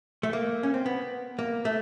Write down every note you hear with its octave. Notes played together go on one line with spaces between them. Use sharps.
A3
A#3
C#4
C4
B3
A#3
A3